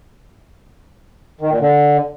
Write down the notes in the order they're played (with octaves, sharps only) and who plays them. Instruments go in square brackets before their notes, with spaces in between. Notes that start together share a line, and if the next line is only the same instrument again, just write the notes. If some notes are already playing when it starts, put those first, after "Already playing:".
[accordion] D#3
A#2
D3